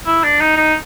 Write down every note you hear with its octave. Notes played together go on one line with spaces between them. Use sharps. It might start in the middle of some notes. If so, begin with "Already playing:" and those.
E4
D4
D#4
D#4